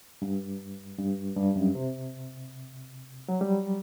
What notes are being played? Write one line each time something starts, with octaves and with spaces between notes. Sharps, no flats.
G2
G2
G2
F#2
C3
F#3
G3